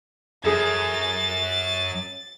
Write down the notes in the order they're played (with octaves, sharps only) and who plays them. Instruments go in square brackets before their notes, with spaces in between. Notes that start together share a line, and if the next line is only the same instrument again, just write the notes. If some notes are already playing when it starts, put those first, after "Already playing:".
[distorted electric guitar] F#2 [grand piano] G#4 A4 [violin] A6